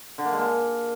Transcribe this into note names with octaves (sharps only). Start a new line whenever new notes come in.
D3
A#3
G#3
A#3